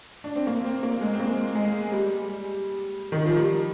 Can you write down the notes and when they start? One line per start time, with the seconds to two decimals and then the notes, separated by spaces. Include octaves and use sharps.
0.24 D4
0.35 C4
0.47 A#3
0.65 C4
0.83 A#3
1.01 G#3
1.14 C4
1.20 A#3
1.55 G#3
1.92 G3
3.12 D#3
3.25 F3
3.37 G3